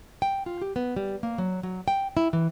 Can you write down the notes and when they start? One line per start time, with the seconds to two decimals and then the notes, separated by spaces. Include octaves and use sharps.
0.22 G5
0.46 F4
0.62 G4
0.76 B3
0.96 G3
1.23 A#3
1.38 F#3
1.63 F#3
1.88 G5
2.17 E4
2.33 E3